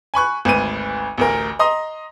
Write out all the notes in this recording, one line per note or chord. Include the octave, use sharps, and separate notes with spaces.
G#5 B5 C#6 F#6
G#1 D2 B4 D#7
A1 D2 A#4
D#5 A#5 C6 D#6